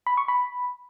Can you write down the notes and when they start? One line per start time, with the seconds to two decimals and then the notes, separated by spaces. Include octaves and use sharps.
0.07 B5
0.17 C#6
0.28 B5